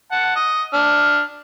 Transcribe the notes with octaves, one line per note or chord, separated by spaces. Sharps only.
F#5 A5
D#5
D4 F6